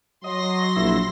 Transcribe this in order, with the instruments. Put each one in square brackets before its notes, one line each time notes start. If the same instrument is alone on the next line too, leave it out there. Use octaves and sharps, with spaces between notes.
[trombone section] F#3 [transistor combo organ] D#5 [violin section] C6 A#6
[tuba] A#1 [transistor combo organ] E4